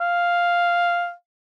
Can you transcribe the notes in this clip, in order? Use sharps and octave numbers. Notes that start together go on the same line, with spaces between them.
F5